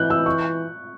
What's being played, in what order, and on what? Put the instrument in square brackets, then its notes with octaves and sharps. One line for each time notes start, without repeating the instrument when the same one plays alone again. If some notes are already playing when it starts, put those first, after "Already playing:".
Already playing: [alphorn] E3 [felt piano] F#6 G6
[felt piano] E6
C#6